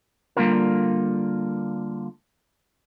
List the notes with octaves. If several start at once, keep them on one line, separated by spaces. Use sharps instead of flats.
D3 G3 A#3 C4 F4 A#4